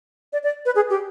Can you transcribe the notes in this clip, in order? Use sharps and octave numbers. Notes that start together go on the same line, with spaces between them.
D5
D5
B4
G#4
G4